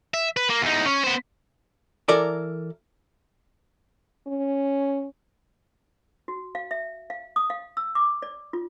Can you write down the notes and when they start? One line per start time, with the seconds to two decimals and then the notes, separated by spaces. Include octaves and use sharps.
0.14 E5
0.36 B4
0.49 A#3
0.61 E2 D#4
0.85 C#4
1.04 B3 C5
2.08 E3 A4 A#4 D5 A#5
4.27 C#4
6.28 F#4
6.55 F5
6.71 E5
7.10 F5
7.36 D#6
7.50 F5
7.77 E6
7.95 D6
8.22 D5
8.53 F4